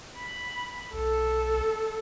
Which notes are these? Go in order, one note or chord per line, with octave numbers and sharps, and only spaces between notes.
B5
B1 A4